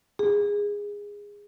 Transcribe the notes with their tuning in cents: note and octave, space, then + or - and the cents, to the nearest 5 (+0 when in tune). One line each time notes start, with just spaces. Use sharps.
G#4 -20